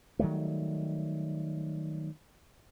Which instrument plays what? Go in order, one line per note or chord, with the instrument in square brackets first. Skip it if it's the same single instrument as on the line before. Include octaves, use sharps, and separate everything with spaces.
[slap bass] D#3 F#3 G3 A3